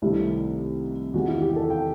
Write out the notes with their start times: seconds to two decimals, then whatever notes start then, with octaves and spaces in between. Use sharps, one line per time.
0.02 C2 C3 D#3 A3 E4
1.14 E2 C3 D#3 F#4
1.28 E4
1.41 G4
1.56 A4
1.70 G5